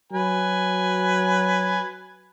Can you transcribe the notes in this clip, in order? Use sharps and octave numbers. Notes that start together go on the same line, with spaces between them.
F#3 B4 G#5